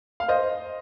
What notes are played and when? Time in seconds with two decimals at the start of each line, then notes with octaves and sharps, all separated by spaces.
0.20 F5
0.28 C5 D#5